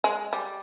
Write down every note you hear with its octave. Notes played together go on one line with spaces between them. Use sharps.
G#3
G3